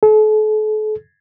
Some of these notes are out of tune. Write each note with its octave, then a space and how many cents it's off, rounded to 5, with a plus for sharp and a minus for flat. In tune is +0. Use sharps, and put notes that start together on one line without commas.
A4 -40